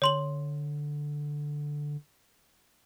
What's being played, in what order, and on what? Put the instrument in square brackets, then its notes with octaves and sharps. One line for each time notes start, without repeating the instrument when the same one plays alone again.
[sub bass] D3 [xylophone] C#5 C6 F#7